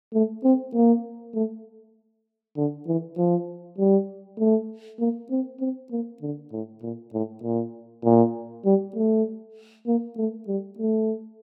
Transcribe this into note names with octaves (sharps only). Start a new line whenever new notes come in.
A3
C4
A#3
A3
D3
E3
F3
G3
A3
A#3
C4
C4
A#3
D3
A2
A#2
A2
A#2
A#2
G3
A3
A#3
A3
G3
A3